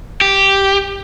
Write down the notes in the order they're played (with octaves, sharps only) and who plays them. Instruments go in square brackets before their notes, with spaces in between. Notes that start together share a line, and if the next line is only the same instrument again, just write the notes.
[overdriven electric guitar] G4